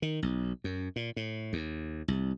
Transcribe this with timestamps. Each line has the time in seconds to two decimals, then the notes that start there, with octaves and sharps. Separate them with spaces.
0.02 D#3
0.22 B1
0.64 F#2
0.96 A#2
1.16 A2
1.53 D#2
2.08 C2